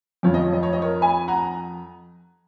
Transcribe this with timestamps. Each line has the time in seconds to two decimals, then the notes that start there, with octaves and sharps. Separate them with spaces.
0.23 F2 F3 C#5
0.34 D#5
0.44 C#5
0.53 D#5
0.63 C#5
0.73 D#5
0.82 A#4 C#5
1.01 G#5 B5
1.28 F#5 A#5